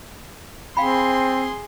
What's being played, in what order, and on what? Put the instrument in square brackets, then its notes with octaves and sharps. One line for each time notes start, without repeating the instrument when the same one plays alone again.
[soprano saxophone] C4 [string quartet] G#4 C6 [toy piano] F5 G5 B5